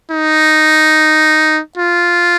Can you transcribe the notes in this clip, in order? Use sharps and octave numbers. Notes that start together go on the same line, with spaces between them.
D#4
F4